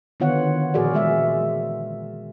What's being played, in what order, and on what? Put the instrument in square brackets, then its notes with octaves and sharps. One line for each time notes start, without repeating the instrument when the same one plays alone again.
[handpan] D3 D#3 B3 F4 C#5 F#5
A#2 F3 F#4 G#4 A#4 D5
E3 G#3 G#4 E5